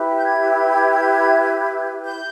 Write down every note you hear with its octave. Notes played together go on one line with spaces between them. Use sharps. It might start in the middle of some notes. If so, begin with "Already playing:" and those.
Already playing: E4 G4 B4
G6
G#6
G6